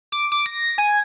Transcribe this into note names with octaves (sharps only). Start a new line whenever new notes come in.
D6
D6
A#6
G#5